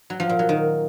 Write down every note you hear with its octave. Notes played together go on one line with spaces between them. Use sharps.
F#3
F3
A#2
F#3
D#3